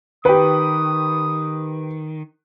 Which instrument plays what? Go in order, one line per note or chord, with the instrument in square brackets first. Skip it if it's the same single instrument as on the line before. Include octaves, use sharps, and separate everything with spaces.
[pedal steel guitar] D#3 [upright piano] G4 B4 [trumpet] D#6